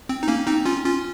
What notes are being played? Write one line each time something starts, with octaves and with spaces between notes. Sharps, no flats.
C4
D#4
A#3 C#4
C4 D#4
C#4 F4
C#4 F4